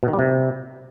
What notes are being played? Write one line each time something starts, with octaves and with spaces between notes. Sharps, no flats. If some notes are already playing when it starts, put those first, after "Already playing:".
B2
D#3
G3
C3